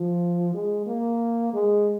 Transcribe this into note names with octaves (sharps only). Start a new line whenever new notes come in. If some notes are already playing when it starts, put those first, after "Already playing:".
Already playing: F3
G#3
A#3
G#3